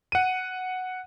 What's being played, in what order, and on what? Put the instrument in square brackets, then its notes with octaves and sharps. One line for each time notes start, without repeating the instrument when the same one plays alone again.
[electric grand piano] F#5 D#7